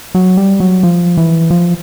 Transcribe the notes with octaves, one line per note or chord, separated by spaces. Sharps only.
F#3
G3
F#3
F3
E3
F3